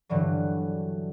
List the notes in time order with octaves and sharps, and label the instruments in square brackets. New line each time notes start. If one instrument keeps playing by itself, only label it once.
[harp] G2 D3 E3 F#3